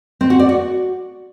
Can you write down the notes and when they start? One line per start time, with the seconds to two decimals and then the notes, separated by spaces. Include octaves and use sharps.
0.21 C4
0.30 F#4
0.39 D5
0.49 F#4